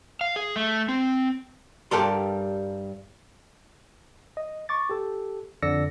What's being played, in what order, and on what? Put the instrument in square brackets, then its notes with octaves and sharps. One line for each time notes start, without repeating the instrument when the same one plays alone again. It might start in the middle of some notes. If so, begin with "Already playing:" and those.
[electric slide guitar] F5
G#4
A3
C4
[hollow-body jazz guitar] G2 G3 A4 A#4 D5 C6
[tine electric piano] D#5
C#6 D6 A6
G4 A4
F2 D3 D5 E6 A#6 C#7